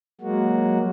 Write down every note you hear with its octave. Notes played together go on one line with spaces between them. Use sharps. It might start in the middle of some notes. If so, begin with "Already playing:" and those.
F#3 G#3 A#3 F#4